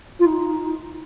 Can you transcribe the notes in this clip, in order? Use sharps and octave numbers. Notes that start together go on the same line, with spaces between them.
F4
D#4